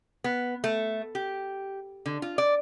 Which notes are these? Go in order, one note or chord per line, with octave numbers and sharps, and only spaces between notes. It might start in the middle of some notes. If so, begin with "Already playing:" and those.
B3
A3
G4
D3
F4
D5